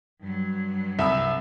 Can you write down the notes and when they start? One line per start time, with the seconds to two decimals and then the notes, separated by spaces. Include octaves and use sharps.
0.21 G2 F#3
0.99 C2 E5 B5 E6